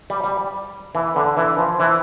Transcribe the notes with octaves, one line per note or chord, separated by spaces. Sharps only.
G3
G3
E3
D3
E3
F3
E3